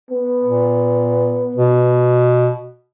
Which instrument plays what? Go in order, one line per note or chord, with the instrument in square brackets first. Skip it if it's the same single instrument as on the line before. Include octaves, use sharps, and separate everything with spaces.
[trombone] B3
[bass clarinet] A#2
B2